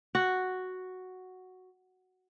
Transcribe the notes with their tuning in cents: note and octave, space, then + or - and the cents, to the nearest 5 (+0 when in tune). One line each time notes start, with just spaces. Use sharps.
F#4 +0